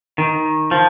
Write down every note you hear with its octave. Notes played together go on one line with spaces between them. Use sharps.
D#3
F3